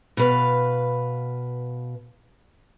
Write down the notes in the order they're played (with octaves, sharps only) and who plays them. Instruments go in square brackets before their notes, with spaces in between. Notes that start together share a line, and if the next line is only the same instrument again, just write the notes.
[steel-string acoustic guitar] B2 B4 F5